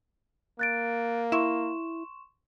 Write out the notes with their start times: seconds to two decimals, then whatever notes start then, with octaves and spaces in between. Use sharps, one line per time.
0.59 A#3 F#6 A6 D7
1.32 E4 C6 C#6 E7